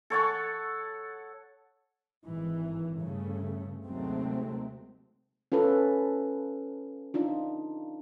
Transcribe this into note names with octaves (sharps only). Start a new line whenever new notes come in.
A4 C#5 F#5 A5
G#1 E3
G2 C#3 A3
D#2 C3 F#3 G#3 A3 C4
C#4 F4 A4 B4
D4 D#4 F4